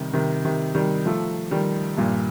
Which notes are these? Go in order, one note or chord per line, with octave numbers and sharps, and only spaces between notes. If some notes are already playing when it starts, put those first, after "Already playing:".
Already playing: C3 D#3 G3
C3 D#3
C3 D#3
D#3 G3
F3 A3
D#3 G3
G2 A#2